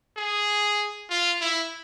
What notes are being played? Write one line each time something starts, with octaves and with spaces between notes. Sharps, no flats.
G#4
F4
E4